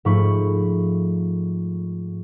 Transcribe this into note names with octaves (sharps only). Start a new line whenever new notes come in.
G#2 F3 A3 B5 C#6